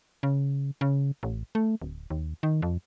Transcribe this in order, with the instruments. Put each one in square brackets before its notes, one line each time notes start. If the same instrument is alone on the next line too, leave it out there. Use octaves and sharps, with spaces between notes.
[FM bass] C#3
C#3
A1
A3
D1
D#2
D#3
F2